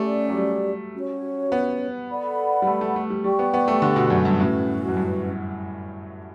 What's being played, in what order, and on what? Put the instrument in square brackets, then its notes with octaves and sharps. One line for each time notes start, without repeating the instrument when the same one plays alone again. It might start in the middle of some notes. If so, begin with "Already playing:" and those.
Already playing: [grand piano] A3 [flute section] C#4 G4 D5
[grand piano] F#3
G3
[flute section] C#4 F#4 C#5
[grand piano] B3
[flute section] A4 D5 F#5 B5
[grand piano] G3
A3
A3
A3
G3
[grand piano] G3 [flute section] G4 D5 G5 C#6
[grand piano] B3
B3
A3
D3
B2
F#2
G2
[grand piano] A2 [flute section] C#4 F#4 B4
[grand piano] F#2
G2